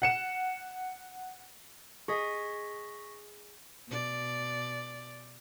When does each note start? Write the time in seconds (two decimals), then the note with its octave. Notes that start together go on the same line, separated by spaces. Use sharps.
0.02 F#5 C#7 E7
2.08 G#4 D#5 C#6 A#6 B6
3.88 B2 D5